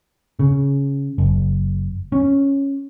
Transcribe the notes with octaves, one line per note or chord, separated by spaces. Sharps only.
C#3
F#1
C#4